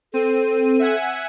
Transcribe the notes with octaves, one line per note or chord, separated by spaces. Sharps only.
C4 A4 D#7
E5 F#5 G#5